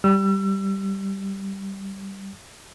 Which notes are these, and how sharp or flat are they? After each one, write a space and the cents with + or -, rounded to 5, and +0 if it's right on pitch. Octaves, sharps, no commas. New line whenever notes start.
G3 -5 E6 +35